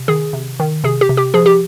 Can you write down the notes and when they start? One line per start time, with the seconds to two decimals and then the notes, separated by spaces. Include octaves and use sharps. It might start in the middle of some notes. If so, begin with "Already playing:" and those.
Already playing: C3
0.08 D#3 G#4
0.33 C3
0.60 D#3
0.84 C3 G#4
1.01 G4
1.09 C3
1.17 G4
1.34 F3 G#4
1.46 G4